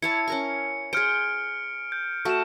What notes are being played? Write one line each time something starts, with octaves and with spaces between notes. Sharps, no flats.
E4 C#5 A5 C#7
C#4 A#4 C#6
G#4 C5 F6 C#7 D7
G6
A3 F#4 C#6 E7